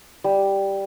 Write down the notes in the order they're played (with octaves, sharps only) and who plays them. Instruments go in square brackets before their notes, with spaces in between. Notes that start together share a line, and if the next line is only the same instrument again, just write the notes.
[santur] G3